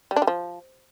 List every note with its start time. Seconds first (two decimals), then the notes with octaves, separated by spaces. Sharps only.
0.11 G3
0.16 D4
0.22 G3
0.27 F3